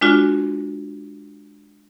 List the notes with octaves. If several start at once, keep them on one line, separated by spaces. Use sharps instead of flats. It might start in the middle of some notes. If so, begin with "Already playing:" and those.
G#3 D4 F4 F#4